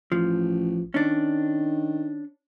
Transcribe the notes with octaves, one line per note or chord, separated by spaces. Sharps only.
A1 F3
D#3 C#4 D4